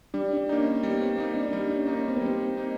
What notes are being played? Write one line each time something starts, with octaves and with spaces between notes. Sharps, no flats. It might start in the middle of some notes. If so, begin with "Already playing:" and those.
G3 D4
D4
A#3 D#4
C#4
G3 C#4
B3
C4
A#3 C4 D#4
D4
G3 D4
D4
C#4
A#3 D#4
C#4
C4
B3
G3 C4
A#3 D#4